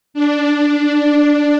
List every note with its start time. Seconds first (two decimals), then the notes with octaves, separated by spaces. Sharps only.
0.14 D4